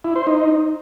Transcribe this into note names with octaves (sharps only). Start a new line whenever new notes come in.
E4
C5
D#4